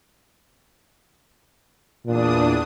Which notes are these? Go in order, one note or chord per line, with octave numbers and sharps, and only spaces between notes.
E2 A#2 D4 D#6